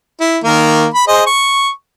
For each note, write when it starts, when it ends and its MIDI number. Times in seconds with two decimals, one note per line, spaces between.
0.21 0.38 64
0.44 0.87 51
0.44 0.87 58
0.44 0.87 70
0.94 1.06 83
1.08 1.24 68
1.08 1.24 72
1.08 1.24 75
1.27 1.70 85